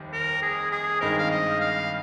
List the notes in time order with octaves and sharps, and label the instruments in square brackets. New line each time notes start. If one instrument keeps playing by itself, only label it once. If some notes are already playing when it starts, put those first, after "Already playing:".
Already playing: [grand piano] F1 D#2 D#3 G3
[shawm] A#4
G#4
G#4
[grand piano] G#1 G2 D#3 G#3 C4 [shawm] A#4
[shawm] F5
D#5
F5